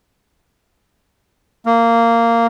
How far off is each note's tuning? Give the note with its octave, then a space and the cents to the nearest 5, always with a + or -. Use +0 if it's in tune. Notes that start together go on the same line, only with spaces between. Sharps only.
A#3 -15